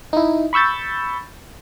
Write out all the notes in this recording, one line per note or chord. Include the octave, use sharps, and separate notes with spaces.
D#4 E4
B5 C#6 E6 G6 A6